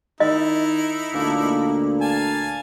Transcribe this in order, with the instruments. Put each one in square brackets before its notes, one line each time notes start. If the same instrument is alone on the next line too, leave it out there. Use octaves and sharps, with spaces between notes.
[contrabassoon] D#3 [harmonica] D#4 E4 [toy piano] D#5
[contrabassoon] D2 [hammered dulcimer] A#2 A#3 A4
[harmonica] F5 G#5 A5